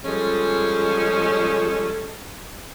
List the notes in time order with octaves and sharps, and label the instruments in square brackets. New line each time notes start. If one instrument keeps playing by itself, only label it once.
[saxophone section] F3 G3 G#3 C#4 G#4 A4